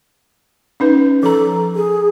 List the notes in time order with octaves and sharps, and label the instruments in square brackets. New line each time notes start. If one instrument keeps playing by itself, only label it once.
[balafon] C#4 D#4 B4
[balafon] F3 A#5 [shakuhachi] A4
[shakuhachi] G#4